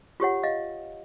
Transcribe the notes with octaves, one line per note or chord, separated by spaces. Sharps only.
F4 G4 C#5 F#5
D#5 F5